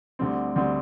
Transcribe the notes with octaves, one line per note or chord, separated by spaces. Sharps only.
D2 D3 G3 C4
D2 D3 G3 C4